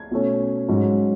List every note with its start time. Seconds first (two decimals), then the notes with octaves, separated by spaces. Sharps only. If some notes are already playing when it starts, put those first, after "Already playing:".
Already playing: G#6
0.11 B2 A3 C#4
0.69 G#2 F#3 C#4